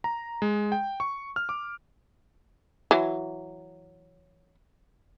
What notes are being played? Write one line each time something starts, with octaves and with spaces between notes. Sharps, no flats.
A#5
G#3
G5
C#6
F6
D6
E3 F#3